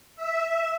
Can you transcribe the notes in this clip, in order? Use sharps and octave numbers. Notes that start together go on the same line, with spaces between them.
E5